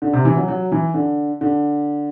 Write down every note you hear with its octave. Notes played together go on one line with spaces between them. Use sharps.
D3
C3
E3
F#3
F#3
E3
D3
D3